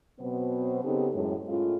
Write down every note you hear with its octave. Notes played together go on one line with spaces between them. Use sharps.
B2 F#3 B3 C4 C5
C#3 B3 C4 D#4 G4 A4
F#2 A2 G#3
A2 G#3 C#4 F4